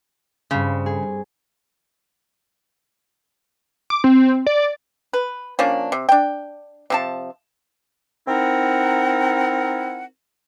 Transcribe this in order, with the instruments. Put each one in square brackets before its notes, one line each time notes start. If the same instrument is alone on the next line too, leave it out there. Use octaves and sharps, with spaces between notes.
[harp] G2 C4 [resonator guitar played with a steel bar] C#3
[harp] G#4
[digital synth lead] D6
C4
D5
[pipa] B4
F3 A#3 C#4 D4
C3
D4 G5
C3 F3 A5
[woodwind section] C4 D#4 E4 A#4 F#5